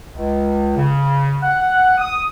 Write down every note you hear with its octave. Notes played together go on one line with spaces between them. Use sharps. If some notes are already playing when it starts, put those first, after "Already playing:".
C#2
C#3
F#5
D#6